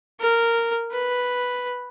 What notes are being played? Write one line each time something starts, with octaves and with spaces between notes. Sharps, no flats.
A#4
B4